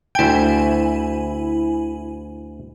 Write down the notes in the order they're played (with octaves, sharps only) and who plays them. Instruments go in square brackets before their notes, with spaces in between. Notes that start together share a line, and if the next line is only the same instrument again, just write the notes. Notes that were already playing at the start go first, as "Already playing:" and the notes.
[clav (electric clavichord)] D2 G5 [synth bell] E4 G#5